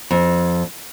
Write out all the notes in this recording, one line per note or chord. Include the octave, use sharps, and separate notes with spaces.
F2